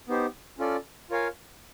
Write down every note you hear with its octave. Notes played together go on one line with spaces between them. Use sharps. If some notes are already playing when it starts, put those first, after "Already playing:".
B3 D#4 G4 C5
C#4 F4 A4 D5
F4 A#4 C#5 F5 G#5